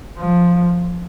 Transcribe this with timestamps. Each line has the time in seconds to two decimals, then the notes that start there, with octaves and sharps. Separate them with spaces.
0.18 F3